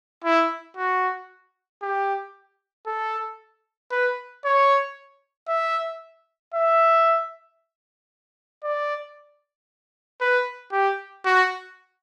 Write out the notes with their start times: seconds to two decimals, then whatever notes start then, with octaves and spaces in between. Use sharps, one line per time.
0.24 E4
0.77 F#4
1.82 G4
2.86 A4
3.91 B4
4.45 C#5
5.48 E5
6.54 E5
8.64 D5
10.21 B4
10.73 G4
11.26 F#4